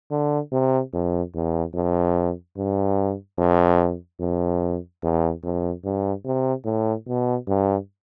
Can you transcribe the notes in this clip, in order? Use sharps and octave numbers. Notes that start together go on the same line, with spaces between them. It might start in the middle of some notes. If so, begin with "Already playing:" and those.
D3
C3
F2
E2
F2
G2
F2
F2
E2
F2
G2
C3
A2
B2
G2